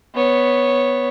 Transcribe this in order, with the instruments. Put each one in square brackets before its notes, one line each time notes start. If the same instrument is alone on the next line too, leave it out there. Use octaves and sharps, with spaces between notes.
[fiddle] B3 C#5